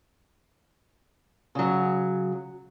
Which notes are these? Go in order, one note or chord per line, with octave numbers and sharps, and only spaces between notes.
C#3 F#3